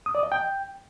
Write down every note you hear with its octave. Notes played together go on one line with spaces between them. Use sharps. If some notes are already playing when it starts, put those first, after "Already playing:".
D#6
D5
D#5
G5